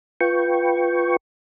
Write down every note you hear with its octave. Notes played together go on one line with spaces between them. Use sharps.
F4 B4 G5 C#6